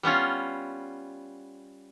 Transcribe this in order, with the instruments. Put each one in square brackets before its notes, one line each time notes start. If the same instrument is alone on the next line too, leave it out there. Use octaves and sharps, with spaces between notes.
[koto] G3 B3 C#4 F4